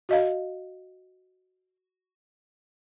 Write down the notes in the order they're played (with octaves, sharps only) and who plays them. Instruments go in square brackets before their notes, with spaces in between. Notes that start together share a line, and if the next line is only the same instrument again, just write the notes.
[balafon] F#4 D#5 F5